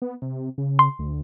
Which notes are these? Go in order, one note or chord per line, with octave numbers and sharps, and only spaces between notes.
B3
C3
C#3
C6
D2